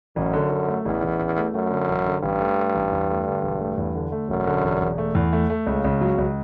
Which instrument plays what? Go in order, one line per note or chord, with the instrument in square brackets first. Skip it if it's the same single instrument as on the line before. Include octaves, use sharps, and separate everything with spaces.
[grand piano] A1 [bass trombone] F#2
[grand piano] D3
D3
A3
[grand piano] A1 [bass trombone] E2
[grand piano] A1
A1
A3
[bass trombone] F#2 [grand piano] A3
[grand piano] D3
A1
D3
[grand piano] A1 [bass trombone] G2
[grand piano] A3
A3
A1
E2
A3
D3
E1
A3
E2
D3
A3
[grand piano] E1 [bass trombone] F#2
[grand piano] D3
E1
E1
A3
E2
A3
A3
[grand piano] C#2 [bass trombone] C#3
[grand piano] C#2
F#3
C#2